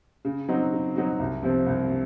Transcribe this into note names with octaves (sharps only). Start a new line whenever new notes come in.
C#3
F#3 C4 D#4 F#4
C#3
F#3 C4 D#4 F#4
C2
C3 F3 C4
C2
C3